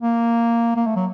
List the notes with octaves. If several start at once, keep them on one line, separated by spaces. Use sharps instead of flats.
A#3
A#3
A3
F#3